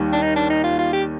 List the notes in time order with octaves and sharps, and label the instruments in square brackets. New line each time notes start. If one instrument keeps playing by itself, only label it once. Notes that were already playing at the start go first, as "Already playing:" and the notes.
Already playing: [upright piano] D#2 D#3 G3
[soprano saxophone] D4
D#4
D4
D#4
F4
F4
G4